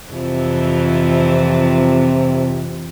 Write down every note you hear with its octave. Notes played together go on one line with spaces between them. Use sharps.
F2 C3 E3 F3